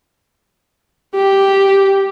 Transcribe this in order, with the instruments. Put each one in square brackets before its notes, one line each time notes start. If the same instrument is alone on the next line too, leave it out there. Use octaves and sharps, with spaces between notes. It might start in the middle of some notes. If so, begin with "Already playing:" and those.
[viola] G4